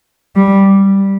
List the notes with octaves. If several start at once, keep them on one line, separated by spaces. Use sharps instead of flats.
G3